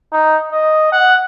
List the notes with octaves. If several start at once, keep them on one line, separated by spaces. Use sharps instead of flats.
D#4
D#5
F#5